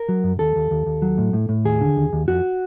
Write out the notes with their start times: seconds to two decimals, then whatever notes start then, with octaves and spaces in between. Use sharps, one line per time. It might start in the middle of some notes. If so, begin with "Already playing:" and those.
Already playing: A#4
0.09 F#3
0.24 F#2
0.39 D#2 A4
0.56 D#2
0.71 D#2
0.86 D#2
1.02 F#3
1.18 A2
1.33 A2
1.49 A2
1.65 D#2 G#4
1.81 D3
1.96 D#2
2.13 D#2
2.28 F2 F#4